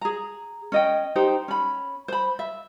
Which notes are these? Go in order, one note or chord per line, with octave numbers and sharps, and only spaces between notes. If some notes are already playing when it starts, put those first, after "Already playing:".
G#4 A#5
C#4 D#5 G5
D#4 G4 C5
C#4 B5
C5 B5
E5